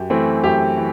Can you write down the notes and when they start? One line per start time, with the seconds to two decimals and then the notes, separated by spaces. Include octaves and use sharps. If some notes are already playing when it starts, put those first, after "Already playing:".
Already playing: F#2 G4
0.10 E3 A3 C4
0.43 F#2 G4
0.77 E3